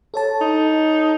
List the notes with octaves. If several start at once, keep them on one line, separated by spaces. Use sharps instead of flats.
A4 C#5 A5
D#4